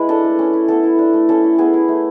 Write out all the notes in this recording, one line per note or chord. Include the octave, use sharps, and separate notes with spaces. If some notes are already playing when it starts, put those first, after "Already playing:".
Already playing: G#3 E4 B4
D4 A4
A3
C#4
E4
B3 A4
E4
D4
A3
C#4 A4
E4
B3 G#4
E4
A3